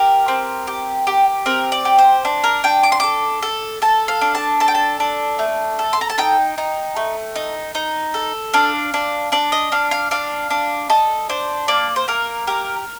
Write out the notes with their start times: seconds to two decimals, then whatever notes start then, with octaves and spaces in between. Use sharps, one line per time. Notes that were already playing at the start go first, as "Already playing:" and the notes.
Already playing: G4 A#4
0.28 C4
0.67 G4
1.07 G4
1.46 C4 A#4
1.72 D5
1.85 G4
1.98 C5
2.25 D4
2.44 A#4
2.64 D4 G5
2.83 D6
2.92 C6
3.00 A4 D6
3.42 A4
3.82 A4 A5
4.08 F5
4.21 D4
4.35 A5
4.60 A4 A5
4.68 G5
4.75 A5
5.00 D4
5.39 A3
5.79 A4
5.93 C6
6.01 A#5
6.10 A5
6.18 D#4 G5
6.58 D#4
6.96 A3
7.36 D#4
7.75 D#4
8.14 A4
8.53 D4 F5
8.94 D4
9.32 D4 D5
9.52 D#5
9.72 D4 F5
9.91 F5
10.11 D4 F5
10.50 D4
10.90 A4 D#5
11.29 D4 C5
11.68 A#3 D5
11.96 C5
12.08 A#3 A#4
12.47 G4 A#4